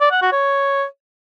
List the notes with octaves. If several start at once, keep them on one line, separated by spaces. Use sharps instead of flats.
D5
F#5
F#4
C#5